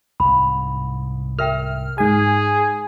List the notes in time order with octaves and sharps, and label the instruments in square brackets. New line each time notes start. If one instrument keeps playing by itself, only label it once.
[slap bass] C2 G#2 [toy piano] B5
[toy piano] A#4 E5 G5 [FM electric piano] F6
[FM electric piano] G#2 G#5 [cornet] G#4